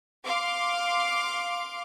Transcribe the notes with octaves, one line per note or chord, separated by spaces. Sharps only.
F5 C6 D6